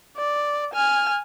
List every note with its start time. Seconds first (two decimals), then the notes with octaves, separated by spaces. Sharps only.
0.16 D5
0.74 G#5 F6